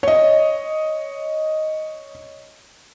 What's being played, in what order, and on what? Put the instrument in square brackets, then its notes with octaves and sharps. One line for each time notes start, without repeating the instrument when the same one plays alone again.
[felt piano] C#5 D#5